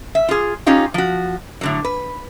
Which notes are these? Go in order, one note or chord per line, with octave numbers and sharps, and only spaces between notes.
E5
F4 G#4
C#4 D#4 F4 G4
F3 F#4
A2 D3 F#3
B4